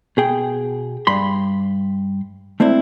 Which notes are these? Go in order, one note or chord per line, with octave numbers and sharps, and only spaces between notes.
B2 G#4 G5
G2 B5 C6
A3 C4 D4 E4